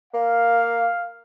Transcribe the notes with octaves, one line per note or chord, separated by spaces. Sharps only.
A#3 F5